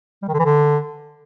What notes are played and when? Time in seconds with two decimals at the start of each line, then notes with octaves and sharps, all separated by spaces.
0.22 G3
0.28 D#3
0.34 D3
0.39 E3
0.45 D3